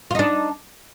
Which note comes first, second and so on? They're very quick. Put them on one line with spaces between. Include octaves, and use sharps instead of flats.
F4 D#4 D4